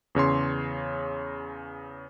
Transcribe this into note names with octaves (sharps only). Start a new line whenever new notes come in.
E2 C#3 C#5 C6